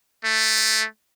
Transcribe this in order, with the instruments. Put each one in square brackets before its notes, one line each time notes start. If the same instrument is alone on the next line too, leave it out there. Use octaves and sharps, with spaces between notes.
[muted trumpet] A3